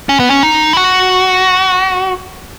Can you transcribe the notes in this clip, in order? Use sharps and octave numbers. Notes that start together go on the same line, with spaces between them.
C#4
B3
C#4
D#4
E4
F#4